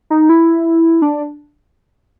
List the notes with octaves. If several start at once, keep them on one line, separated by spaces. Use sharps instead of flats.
D#4
E4
D4